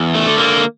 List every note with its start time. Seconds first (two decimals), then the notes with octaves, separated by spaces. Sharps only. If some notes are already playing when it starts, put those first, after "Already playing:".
Already playing: E2
0.15 A3
0.27 D3
0.38 A#3